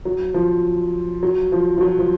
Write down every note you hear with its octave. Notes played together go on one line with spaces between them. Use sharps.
F#3
F3
F#3
F3
F3
F#3
F3